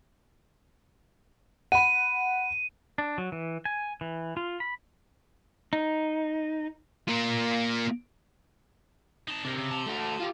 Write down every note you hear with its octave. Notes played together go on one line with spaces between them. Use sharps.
F#5 B5 D#7
D4
F#3
E3
G#5
E3
F4
B5
D#4
A#3 F4
D#4 A5
C3 D4 A#4
C#3
A5 C6
A3 F#4
F4 G4